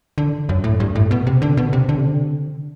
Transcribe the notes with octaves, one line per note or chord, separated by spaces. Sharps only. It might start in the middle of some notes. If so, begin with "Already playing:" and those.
D3
F#2
A2
G2
A2
B2
C3
D3
B2
C3
D3
C3
D3